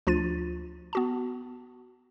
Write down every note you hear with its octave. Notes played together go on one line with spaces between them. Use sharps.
D2 F3 D4 F4 A6 D#7
B3 F#4 A5